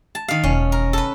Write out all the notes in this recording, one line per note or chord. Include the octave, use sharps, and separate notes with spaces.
A5
D#3 F5
E1 C#4
A#4
A4 B4